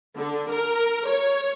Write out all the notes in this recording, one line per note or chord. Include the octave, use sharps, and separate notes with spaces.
D3
A#4
C#5